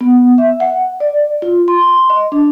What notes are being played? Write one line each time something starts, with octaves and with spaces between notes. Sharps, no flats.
B3
E5
F#5
D5
F4
C6
D#5
D4